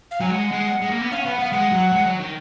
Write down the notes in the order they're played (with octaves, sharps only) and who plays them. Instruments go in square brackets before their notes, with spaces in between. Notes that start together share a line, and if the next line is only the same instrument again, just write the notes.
[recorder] F5
[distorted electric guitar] F#3 [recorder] G#5
[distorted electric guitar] G#3 [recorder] F#5
[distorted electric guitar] G#3
G#3
A#3
B3
[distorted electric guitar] C#4 [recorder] F5
[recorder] F#5
F5
[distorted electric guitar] B3
[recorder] F#5
[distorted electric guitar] B3 [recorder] F5
[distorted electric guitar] G#3 [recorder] F#5
[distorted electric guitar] F#3
G#3
F#3
D#3